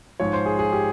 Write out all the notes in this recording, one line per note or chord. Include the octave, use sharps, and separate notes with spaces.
G#2 F3 C#5
C5
G#4
G#4
G4